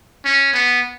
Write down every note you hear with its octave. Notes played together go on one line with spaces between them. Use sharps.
C#4
B3